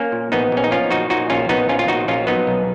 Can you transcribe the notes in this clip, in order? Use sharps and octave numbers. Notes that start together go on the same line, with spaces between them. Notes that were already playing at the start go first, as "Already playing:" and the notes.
Already playing: A#3 C#4
A#2
A#1 B3 D#4
A#1 C#4
D#4
F3 C#4 F4
A#2 D#4 F#4
A#2 D#4 F#4
A#1 C#4 F4
A#1 B3 D#4
A#1 C#4 F4
F4
A#1 D#4 F#4
A#1 C#4 F4
F#3 B3 D#4
B1